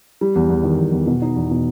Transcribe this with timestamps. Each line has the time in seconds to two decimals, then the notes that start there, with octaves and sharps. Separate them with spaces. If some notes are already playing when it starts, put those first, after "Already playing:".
0.21 G3
0.35 E2
0.50 E2
0.64 D#3
0.78 E2
0.92 E2
1.07 B2
1.22 D#4
1.36 E2
1.51 B2